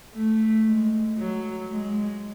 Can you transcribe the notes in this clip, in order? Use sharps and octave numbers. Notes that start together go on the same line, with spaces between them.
A3
G#3
F#3
G#3